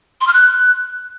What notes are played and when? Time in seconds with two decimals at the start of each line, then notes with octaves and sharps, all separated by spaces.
0.21 C6
0.27 F6
0.33 F#6